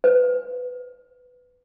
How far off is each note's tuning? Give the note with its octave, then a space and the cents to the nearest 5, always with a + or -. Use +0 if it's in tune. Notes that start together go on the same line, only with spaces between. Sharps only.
B4 +10